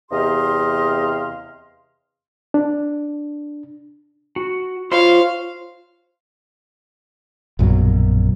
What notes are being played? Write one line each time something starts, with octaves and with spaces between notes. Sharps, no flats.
E2 C3 G4 D#5 F5 C6
D4
F#4
F4 C5 C#5 F5 C6
A#1 F#2 B2 F#3